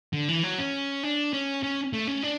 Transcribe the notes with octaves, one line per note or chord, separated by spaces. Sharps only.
D3
E3
F#3
C#4
D4
C#4
C#4
A3
C#4
D4